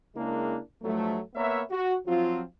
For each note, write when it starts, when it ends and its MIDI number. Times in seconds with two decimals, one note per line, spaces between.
0.16 0.58 49
0.16 0.58 56
0.16 0.58 58
0.16 0.58 62
0.16 0.58 64
0.16 0.58 70
0.82 1.20 43
0.82 1.20 53
0.82 1.20 54
0.82 1.20 57
1.35 1.62 58
1.35 1.62 59
1.35 1.62 70
1.35 1.62 71
1.35 1.62 73
1.35 1.62 76
1.71 1.95 66
2.07 2.42 53
2.07 2.42 54
2.07 2.42 60
2.07 2.42 65